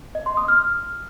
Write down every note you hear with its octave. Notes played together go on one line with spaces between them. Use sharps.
D#5
C6
D#6
F6